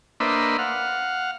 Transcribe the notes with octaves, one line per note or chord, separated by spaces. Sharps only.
A#3 D4 B4 C5 D#5 E5
F5 F#5